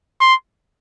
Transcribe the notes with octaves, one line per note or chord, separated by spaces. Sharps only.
C6